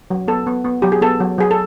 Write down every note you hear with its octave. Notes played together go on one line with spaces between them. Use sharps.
F#3
B3 A4
B3
B3
F#3 G4
G#4
B3 A4
F#3
F#3 G#4
A4